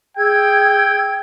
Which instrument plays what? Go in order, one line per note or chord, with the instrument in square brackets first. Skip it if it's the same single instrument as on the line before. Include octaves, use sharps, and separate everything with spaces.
[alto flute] G#4 [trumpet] G5 [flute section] E6 G#6